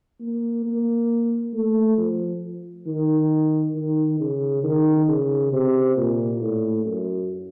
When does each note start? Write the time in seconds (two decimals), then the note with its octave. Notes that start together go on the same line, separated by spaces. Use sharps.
0.20 A#3
0.65 A#3
1.53 A3
1.97 F3
2.86 D#3
3.75 D#3
4.19 C#3
4.63 D#3
5.09 C#3
5.52 C3
5.96 A#2
6.41 A2
6.85 F#2